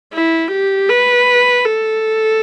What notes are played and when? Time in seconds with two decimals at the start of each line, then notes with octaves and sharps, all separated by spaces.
0.13 E4
0.51 G4
0.89 B4
1.65 A4